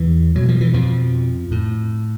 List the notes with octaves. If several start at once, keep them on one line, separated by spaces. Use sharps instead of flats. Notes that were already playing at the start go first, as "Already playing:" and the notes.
Already playing: E2 E3
B2 F#3
F3
E3
F2 F3
A2